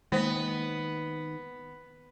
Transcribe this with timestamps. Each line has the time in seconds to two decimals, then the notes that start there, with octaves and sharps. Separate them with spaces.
0.12 D#3 G#3 A#3 B3 C5